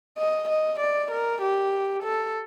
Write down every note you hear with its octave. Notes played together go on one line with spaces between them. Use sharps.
D#5
D#5
D5
A#4
G4
A4